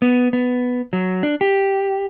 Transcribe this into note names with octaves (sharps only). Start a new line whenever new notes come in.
B3
B3
F#3
D4
G4